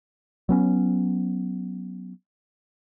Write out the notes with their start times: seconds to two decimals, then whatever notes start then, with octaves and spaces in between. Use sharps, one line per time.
0.49 F#3 B3 C#4